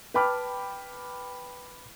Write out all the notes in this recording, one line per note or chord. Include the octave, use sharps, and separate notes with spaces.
B4 G5 A5 B5 D6 F6